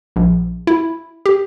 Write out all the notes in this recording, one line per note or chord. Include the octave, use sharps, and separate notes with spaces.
A#1
E4
G4